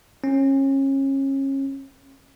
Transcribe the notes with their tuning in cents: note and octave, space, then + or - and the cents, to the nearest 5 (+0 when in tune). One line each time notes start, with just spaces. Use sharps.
C#4 -30